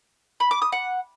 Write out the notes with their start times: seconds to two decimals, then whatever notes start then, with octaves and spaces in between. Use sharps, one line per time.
0.40 B5
0.51 D6
0.62 D#6
0.72 F#5